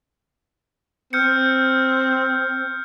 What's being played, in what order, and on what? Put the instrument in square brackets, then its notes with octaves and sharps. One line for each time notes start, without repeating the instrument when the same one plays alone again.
[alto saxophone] C4 [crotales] F6 G6 C#7